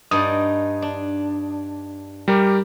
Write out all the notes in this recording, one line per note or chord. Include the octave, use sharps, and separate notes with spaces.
G2 D#4 D5 D#6
D4
G3 G4 A#4